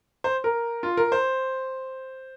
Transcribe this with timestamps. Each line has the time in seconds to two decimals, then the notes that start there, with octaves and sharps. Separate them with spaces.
0.24 C5
0.44 A#4
0.83 F4
0.97 A#4
1.12 C5